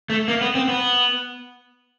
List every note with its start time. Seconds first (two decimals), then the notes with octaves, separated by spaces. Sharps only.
0.10 A3
0.28 A#3
0.41 B3
0.55 C4
0.68 B3